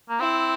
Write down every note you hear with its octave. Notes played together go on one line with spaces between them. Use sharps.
A#3
C4 E4